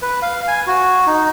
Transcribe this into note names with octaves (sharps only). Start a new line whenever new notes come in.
B4
F5
G#5
F#4
D#4